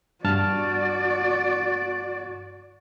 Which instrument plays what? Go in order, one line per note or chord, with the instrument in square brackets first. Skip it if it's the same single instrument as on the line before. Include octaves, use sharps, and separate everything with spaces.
[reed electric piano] G2 A5 F6 [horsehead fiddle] F#4 D5